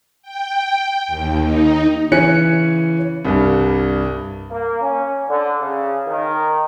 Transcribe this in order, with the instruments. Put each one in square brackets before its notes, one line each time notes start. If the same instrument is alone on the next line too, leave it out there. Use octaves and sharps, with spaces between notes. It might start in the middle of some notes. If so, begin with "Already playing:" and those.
[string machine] G5
D#2
D#4
[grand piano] C#3 E3 C#4 G#5 F#6 C#7
C2 G2
[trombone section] A#3
C#4
D3
C#3
D#3